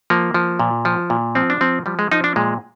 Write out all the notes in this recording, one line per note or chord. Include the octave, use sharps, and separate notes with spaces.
F3 A#3
F3
A#2
F3
A#2
F3 C4
D4
F3 C4
F3 G3
G#3
F3 D#4
D4
A#2 G#3